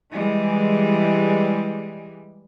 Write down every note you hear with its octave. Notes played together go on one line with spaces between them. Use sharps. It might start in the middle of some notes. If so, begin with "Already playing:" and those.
E3 G3 G#3